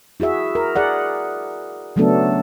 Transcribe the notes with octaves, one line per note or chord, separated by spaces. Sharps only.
E4 F#4 G#4 E5
A#4
G#4 D5 F#5
C#3 F#3 A3 B3 D4 A4